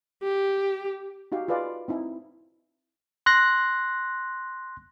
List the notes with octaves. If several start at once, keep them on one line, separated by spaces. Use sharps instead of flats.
G4
D#4 F#4 G4 F5
F4 G#4 B4 D5 D#5 F5
C4 D#4 E4
C6 F#6 A#6